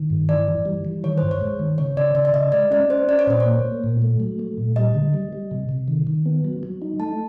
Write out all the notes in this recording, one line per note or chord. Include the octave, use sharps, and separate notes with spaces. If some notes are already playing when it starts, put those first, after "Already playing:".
Already playing: D#3
G2
E3 D5
E3
G3
E3
D#3 C#5
G2 C5
C#5
G#3
D#3
C#3 C#5
C#3 D5
C#3 D5
D5
C#3 D#5
G#3 D5
C#4 D5
C#4 C5
C#4 D5
C#5
A#2 C5
C#5
A#3
A#3
A#2
A3
F#3
A3
A#2
G3 D#5
D3
G3
G3
C3
C3
D#3
D#3
B3
F#3
F#3
D#4
A3 A5